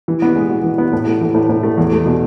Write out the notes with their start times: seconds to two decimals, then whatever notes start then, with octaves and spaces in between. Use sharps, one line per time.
0.08 E3
0.22 B3
0.36 G#3
0.50 F#4
0.64 E3
0.78 B3
0.93 A2
1.07 A3
1.21 E3
1.35 A2
1.49 A2
1.63 A3
1.78 E2
1.92 A3
2.06 B2